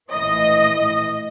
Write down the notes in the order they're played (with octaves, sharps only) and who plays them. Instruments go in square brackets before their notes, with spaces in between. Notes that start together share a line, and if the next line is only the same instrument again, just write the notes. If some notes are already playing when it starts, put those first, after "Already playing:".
[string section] A#1 A2 E3 D#5